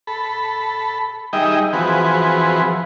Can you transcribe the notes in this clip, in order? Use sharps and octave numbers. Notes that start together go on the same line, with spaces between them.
A4 B5
G3 D#4 G#4 D#5 E5 G5
E3 F3 C4 F#4 G#4 B4